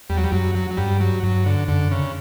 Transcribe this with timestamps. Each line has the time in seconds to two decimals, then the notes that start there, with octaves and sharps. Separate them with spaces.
0.10 E2 G3
0.17 F#3
0.24 G3
0.32 F#2 F#3
0.55 F#3
0.71 F#3
0.77 G2 G3
1.00 F#3
1.23 G2 F#3
1.46 D3
1.68 F#2 D3
1.91 C#3